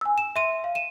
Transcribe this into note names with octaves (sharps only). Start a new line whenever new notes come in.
G#5 E6
E7
E5 C6 D#7
F5
D#7 E7